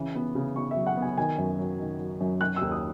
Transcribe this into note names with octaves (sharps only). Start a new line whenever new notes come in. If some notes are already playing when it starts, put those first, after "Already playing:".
Already playing: C#3 E3
B3
C#3
B3 C#6
E5
F#3
F#5
B3
G#5
D#3 G#5
F#2
F#3
D#3
F#3
F#2
F#3 F#6
D#2 E6
D#6